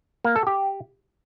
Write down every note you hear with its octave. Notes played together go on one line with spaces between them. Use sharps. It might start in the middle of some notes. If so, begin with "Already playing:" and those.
A#3
A4
G4